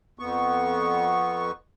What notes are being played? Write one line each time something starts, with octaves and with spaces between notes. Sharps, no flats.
F2 B3 C#6